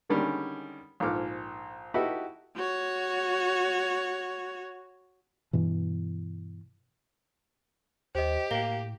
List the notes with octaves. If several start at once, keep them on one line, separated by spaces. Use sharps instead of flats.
D3 D#3 G3 G#3 C#4
A#1 G#2 A4 D6 F6
D#4 E4 F#4 G4 A4 B4
F#4 C#5
G2 B2 E3
D#2 G4 C5 D#5
A2 A#3 G7